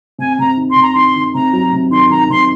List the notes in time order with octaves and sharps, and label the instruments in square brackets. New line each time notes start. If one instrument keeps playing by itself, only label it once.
[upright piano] C3 [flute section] G#5
[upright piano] C3 [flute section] A#5
[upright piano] D#3
[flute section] C6
[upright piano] C3
[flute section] A#5
[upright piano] D#3 [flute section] C6
[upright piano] D#3
[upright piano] C3 [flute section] A#5
[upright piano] F#3
C3
[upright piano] D#3 [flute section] C6
[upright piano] D#3 [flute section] A#5
[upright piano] C3 [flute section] C6